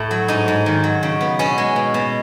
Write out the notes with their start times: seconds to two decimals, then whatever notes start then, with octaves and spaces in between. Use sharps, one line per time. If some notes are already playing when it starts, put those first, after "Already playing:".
Already playing: A2 E4
0.11 F#3
0.28 G#2 D#4
0.48 G#2
0.66 D#3
0.84 F#3
1.03 C#3
1.21 B3
1.39 B2 C#4
1.58 G#3
1.76 B2
1.94 B2